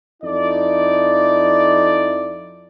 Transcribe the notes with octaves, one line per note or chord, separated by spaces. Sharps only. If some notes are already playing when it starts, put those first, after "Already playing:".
F2 D#4 E4 A4 D5